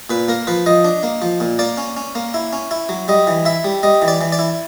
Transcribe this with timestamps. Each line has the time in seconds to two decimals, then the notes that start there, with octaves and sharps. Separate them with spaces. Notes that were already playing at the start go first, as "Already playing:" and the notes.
0.10 A#2 B4
0.28 A#3 A#4
0.47 F3 B4
0.66 F3 D#5
0.85 D4
1.03 A#3
1.22 F3
1.40 A#2
1.59 A#3 D5
1.78 C#4
1.97 C#4
2.15 A#3
2.34 E4
2.53 C#4
2.71 E4
2.89 F#3
3.08 G3 D#5
3.27 E3
3.45 E4 E5
3.64 G3
3.83 G3 D#5
4.02 E3
4.08 D5
4.21 E3
4.32 D5
4.39 E4